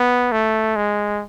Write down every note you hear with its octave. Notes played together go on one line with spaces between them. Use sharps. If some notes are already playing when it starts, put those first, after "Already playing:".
Already playing: B3
A3
G#3